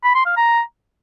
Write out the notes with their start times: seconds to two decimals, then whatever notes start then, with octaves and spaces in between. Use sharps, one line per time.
0.04 B5
0.15 C6
0.26 F5
0.37 A#5